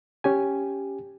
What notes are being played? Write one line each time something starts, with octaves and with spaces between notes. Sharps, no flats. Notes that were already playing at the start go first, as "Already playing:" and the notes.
C#4 G4 G#5